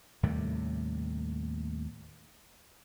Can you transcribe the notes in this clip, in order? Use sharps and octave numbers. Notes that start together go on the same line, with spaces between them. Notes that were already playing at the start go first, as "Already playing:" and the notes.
D#2 A2 C3 G3